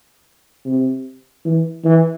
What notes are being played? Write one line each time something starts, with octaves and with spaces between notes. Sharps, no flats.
C3
E3
E3